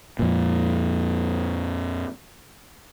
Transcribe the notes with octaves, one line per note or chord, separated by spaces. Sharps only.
F2 A#2